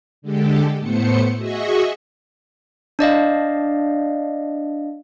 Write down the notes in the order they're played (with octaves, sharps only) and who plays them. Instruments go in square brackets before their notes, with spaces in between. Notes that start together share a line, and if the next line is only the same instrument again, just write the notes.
[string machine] D3 G#3 G4 A4
A2 A3 B3 C5 C#7
F#4 G#4 D#5 E5 C#6
[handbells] D4 D5 D#5 F5